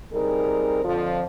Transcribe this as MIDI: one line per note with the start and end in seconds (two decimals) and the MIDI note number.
0.13 0.82 55
0.13 0.82 60
0.13 0.82 63
0.13 0.82 68
0.13 0.82 70
0.85 1.23 41
0.85 1.23 50
0.85 1.23 53